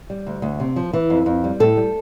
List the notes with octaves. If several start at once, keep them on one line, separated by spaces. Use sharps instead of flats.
G3
D2
D2
C3
F3
E3
F2
F2
G3
A2 A4
G3